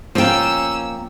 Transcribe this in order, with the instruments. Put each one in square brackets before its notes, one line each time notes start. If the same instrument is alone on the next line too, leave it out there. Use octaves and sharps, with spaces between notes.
[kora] F3 [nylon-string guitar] A#3 G5 [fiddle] C#4 E6